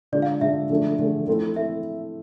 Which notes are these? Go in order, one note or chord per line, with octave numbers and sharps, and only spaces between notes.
D3 G#3 D4 F4 D5
F5
D3 G#3 D4 F4 E5
D3 F3 A3 D4 G#4
D3 F3 A3 D4 G#4
F3 A3 C4 E4 A4
E4 A4 E5